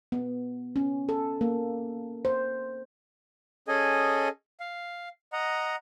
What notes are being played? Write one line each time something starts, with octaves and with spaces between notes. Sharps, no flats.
B3
C#4
A4
A#3
C5
C#4 G#4 A4 D#5 G#5
F5
D#5 F#5 A#5